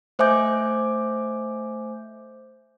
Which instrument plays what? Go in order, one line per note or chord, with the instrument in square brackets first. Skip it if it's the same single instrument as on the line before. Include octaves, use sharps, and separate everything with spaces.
[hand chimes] A3 C5 E5 G#5 D6 G6